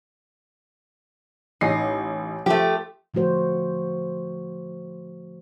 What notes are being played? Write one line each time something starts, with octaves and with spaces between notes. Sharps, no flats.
A1 D#4 C7
F3 A3 G4
D3 F3 A3 F#4 C5